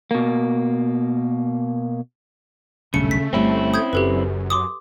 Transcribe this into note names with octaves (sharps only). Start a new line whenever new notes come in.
B2 A#3
D#1 B1 G2 C#3 A3 C#7
B6
G1 D#3 G3 C4 C#4 E4
D#6 G6 G#6
F#1 F#2 G4 A4 B4
C6 D6 D#6